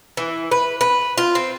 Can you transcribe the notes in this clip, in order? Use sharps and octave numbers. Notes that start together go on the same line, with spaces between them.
E3
B4
B4
F4
C4